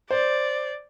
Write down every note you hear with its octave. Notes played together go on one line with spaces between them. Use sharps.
C5 D5